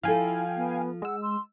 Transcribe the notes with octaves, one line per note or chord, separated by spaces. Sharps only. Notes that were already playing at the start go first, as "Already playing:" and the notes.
F3 E4 F4 A4 F5 G5 G#5
B3
G#3 F#5 E6
C6